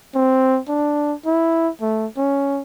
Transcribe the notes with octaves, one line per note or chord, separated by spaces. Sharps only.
C4
D4
E4
A3
C#4